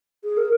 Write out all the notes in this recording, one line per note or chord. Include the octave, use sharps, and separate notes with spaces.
G#4
A#4